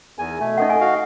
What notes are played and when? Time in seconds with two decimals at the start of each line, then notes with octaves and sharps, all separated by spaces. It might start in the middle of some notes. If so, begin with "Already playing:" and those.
0.19 E2 D#4 G#4 A#4 G#5
0.40 B2 A3
0.58 D#4 A4 D#5 F#5
0.69 G#5
0.81 F#4 F5